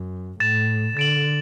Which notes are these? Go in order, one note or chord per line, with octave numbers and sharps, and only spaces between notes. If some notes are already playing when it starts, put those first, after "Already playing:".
Already playing: F#2
A2 A6 E7
D3 A6 D7 F#7